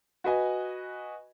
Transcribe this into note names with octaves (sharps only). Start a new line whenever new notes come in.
F#4 B4 D#5 G#5